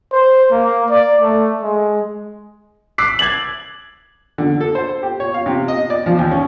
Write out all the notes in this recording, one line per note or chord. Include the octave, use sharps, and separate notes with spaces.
C5
A#3
D5
A3
G#3
D6 E6 F#6 B6 C7
G#6 A6 F#7
D3
A4
C5
G4
C#5
F5
C3
D#5
D5
F3
D#2
C#4